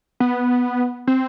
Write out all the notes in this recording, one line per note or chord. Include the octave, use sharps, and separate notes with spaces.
B3
C4